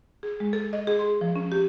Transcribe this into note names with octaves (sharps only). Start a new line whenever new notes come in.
G#4
G#3
A4
D#5
G#4
C6
F3
C#4
G4